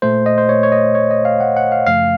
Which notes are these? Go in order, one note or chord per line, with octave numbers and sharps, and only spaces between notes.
A#2 A3 C5
D#5
C5
A#2 A3 C#5
C#5
D#5
A#2 A3 C#5
D#5
F5
A#2 A3 F#5
F#5
F5
F#2 C#3 F3 A3 F5